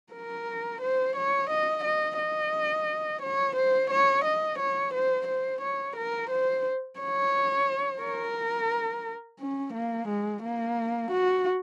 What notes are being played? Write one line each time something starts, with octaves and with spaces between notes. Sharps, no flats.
A#4
C5
C#5
D#5
D#5
D#5
C#5
C5
C#5
D#5
C#5
C5
C5
C#5
A#4
C5
C#5
A#4
C#4
A#3
G#3
A#3
F#4